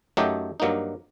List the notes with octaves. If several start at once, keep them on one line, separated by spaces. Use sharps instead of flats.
F#2 F#3 A3 D#4 G4
G2 F#3 A#3 D#4